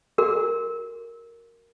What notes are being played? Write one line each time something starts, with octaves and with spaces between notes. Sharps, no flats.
F#4 A#4